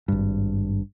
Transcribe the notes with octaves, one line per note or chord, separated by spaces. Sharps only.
G#1 G2